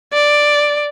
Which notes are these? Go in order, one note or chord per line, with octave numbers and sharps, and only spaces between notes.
D5